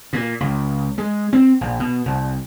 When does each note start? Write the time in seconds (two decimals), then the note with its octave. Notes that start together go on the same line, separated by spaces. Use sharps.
0.13 A#2
0.40 C#2
0.98 G#3
1.33 C4
1.61 A#1
1.80 B2
2.06 C2